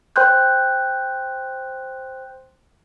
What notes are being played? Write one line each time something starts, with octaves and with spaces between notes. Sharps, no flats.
C5 G5 C6 F#6 G6